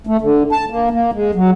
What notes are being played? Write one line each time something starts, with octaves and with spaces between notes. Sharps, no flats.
A3
D3
A5
A#3
A#3
G#3
F#3